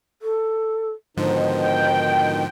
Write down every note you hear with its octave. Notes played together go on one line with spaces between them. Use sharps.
A4
G#2 B2 D3 D#3 F3 D#4 C5
G5